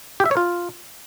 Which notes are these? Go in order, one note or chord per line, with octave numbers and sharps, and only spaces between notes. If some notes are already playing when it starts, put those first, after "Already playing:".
G4
E5
C#5
F4